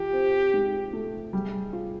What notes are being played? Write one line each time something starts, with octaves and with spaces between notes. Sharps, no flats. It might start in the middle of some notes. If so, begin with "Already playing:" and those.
Already playing: F3 G4
C4
G#2
A3
G3 G#4
F4